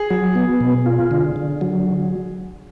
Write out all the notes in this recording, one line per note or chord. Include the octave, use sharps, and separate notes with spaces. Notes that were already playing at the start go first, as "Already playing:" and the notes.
Already playing: G#4
F#3
B3
B2
F4
D3
D3
F#3